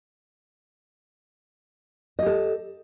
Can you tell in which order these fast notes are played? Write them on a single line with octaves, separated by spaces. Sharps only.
D#5 G4 A4